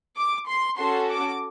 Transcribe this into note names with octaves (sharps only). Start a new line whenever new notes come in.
D6
C6
C#4 F#4 A4 C6
D6